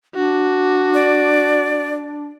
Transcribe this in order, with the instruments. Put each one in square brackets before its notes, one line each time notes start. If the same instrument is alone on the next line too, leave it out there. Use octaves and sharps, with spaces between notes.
[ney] D4 [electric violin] F#4
[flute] D5